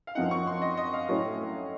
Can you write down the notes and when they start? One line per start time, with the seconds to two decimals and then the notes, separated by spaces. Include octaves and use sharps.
0.07 F5
0.15 F#2 F3 C4 D#4 F#5
0.31 C#6
0.47 C6
0.62 D#5
0.77 D#5
0.94 F5
1.09 A2 F#3 A3 C#4